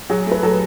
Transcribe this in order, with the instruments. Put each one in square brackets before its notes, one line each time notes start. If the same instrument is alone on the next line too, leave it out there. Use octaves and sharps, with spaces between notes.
[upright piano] F#3 [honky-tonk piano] G#4
[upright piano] A3 [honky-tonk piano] B4
[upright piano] F#3 [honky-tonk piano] A4